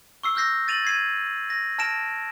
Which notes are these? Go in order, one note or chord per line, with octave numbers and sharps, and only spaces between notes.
C#6 E6 C7
E6 F6 G6 A#6 C7
A6 D#7 F7 F#7
G#6 C7 D#7
A#6
A5 F6 A#6 D7 E7